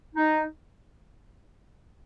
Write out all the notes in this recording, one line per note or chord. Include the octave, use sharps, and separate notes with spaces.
D#4